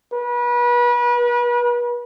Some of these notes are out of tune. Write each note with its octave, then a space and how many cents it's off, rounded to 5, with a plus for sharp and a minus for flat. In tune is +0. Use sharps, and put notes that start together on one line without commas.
B4 -35